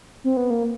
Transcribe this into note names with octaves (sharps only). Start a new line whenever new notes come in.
C4
B3
A#3